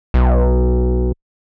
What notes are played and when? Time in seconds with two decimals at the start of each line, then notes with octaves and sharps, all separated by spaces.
0.14 B1